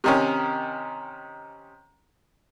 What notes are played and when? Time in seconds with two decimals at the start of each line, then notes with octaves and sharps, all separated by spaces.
0.04 C3 D#3 C#4